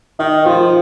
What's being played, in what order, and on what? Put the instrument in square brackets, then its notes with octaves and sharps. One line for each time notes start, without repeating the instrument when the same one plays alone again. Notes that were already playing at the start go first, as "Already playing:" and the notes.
[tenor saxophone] D#3 [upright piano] D#4
[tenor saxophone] F3 [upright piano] F4